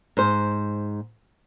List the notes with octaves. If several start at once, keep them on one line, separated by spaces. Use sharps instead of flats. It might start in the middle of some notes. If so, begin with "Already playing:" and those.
G#2 C5